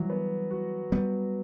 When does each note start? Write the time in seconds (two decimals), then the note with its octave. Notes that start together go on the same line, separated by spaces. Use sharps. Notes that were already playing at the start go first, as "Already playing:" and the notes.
Already playing: E3 F#3 G3
0.10 B3
0.51 F#4
0.92 G3 B3 B4